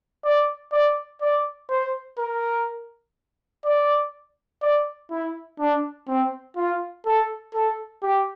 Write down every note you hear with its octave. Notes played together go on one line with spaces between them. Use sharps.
D5
D5
D5
C5
A#4
D5
D5
E4
D4
C4
F4
A4
A4
G4